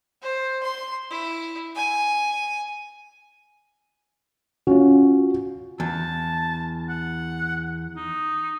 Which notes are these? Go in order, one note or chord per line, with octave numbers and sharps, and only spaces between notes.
C5
C6
E4
G#5
C#4 F4 F#4
E2 A5
F#5
D#4